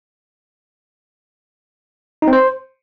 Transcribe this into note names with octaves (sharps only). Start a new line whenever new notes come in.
D#4
C4
C5